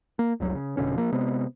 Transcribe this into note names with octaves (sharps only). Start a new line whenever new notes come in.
A#3
F1 C2 F#3
C#3
F1 B2 D3 C#4
F3 A#3
C3 G#3 B3